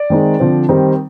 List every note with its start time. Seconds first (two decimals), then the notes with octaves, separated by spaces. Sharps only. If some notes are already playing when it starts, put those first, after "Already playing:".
Already playing: D5
0.10 D#3 G#3 C4 D#4
0.40 D3 F3 C4
0.69 D#3 G3 C4 D#4